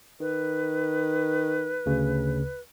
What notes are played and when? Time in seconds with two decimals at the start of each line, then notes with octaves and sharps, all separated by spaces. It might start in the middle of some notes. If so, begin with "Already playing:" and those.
0.20 D#3 B4
1.86 D2 C#3